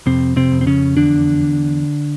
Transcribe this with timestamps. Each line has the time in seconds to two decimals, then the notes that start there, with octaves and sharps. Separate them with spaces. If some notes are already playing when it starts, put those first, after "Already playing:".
0.06 F2 C3 C4
0.36 C3 C4
0.52 F2
0.61 C4
0.67 C#3 C#4
0.97 E2 D3 D4